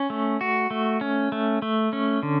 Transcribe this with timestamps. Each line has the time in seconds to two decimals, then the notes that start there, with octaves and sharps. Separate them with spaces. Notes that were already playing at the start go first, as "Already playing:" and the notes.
Already playing: C#4
0.10 A3
0.41 F#4
0.71 A3
1.01 C#4
1.32 A3
1.62 A3
1.93 C#4
2.23 D3